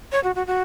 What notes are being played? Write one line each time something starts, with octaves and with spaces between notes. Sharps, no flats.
C#5
F#4
F#4
F#4